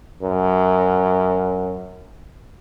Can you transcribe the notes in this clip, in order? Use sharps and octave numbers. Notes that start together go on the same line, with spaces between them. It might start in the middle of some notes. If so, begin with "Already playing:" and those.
F#2